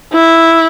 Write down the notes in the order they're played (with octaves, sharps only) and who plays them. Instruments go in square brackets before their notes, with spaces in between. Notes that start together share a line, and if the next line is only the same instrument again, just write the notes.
[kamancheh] E4